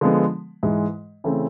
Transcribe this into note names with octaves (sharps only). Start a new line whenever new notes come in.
D3 F3 G#3 B3
G#2 E3 G#3
C#3 E3 A3 C4